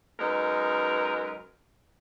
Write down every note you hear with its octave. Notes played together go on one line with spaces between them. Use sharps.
F#2 G#3 D#4 A#4 B4